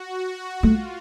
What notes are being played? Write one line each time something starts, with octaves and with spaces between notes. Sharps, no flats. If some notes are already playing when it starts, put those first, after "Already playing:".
Already playing: F#4
A3 F4